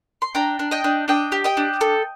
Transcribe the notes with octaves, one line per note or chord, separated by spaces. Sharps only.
C6
D4 G5 A#5
D4
D#5 G5
D4
D4 D#5 G5
G4
D#5 G5
D4
A4